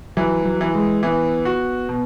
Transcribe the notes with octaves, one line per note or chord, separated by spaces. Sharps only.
E3 F#3
F#3
E3
G#3
E3 B3
F#4
B2